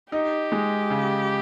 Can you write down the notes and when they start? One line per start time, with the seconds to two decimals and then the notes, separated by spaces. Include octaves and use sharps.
0.12 D#4 G4
0.52 G#3
0.90 C#3